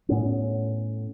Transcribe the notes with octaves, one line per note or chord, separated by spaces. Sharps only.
A2 B3 C#4